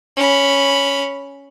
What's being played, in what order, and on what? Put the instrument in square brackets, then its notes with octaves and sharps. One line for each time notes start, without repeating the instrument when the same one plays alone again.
[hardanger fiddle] C#4 B5